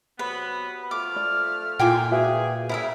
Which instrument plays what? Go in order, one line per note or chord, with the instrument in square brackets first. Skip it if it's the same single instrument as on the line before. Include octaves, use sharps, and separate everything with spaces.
[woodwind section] C3 F#3 B3 [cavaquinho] B4
[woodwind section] F3 A3 F6 [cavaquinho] D6
[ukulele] D5
[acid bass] A#2 [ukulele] E4 F4 F5 [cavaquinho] G5 G#5 D6
[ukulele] F#4 B4 E5 [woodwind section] G#4
[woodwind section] C#3 [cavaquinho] E4 A#4 E5 [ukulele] C5